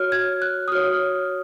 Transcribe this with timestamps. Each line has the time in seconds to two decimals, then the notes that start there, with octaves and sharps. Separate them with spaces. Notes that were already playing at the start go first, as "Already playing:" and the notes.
Already playing: F#4 C#5 F6
0.12 G#6
0.42 F#6
0.68 D#6
0.72 F#4 C#5 F6